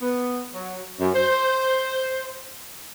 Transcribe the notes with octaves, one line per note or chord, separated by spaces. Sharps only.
B3
F#3
F#2
C5